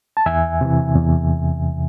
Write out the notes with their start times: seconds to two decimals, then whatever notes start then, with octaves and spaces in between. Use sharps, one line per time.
0.17 A5
0.26 E2 E5 G#5
0.61 C3 E3
0.96 E2